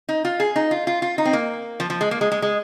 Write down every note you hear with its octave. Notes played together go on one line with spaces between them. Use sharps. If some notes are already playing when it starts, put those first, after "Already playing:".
D#4
F4
G#4
D#4
F4
F4
F4
D#4
C4
A#3
F3
F3
G#3
A#3
G#3
G#3
G#3